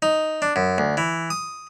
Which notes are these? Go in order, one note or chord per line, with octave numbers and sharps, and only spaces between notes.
D#4
D4
F#2
D2
E3
D#6